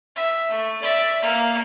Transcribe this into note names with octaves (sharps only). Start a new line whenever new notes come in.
E5
A3
D5 E5
A#3